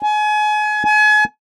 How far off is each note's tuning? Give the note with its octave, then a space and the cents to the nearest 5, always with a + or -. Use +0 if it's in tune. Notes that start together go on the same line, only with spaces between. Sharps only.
G#5 +30
G#5 +35